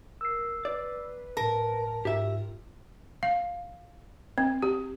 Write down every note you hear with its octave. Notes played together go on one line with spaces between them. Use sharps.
A#4 E6 C7
B4 D5
A2 A#4 A5
G#2 F4 G4 E5
F5
C4
G4